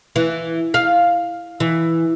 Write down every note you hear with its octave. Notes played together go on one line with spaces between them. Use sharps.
E3
F5
E3